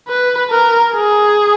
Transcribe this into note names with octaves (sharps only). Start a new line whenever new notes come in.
B4
A#4
G#4